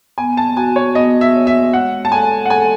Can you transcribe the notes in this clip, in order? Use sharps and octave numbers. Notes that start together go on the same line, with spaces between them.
B3 G#5
A5
F#4 G#5
C#5
B3 D#5
E5
C#5
E5
G#3 F#5
A5
A4 G#5
F#5
A4 G#5